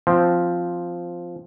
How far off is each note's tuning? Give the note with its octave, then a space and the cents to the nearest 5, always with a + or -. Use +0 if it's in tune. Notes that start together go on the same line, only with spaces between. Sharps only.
F3 +0 C4 +0